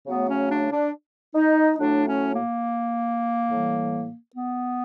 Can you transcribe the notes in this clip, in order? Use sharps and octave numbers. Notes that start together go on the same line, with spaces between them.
C#3 F#3 A3 B3
C#4
D4
D4
D#4
A2 F#3 A3 D4
C#4
A#3
A2 E3 G3
B3